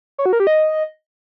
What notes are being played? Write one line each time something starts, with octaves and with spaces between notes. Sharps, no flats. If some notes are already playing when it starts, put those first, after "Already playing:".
C#5
F#4
A#4
G4
D#5